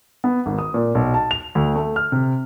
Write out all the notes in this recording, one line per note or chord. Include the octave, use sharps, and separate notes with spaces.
B3
G#1
D#6
A#2
B1
A5
F7
D2
A3
F6
C3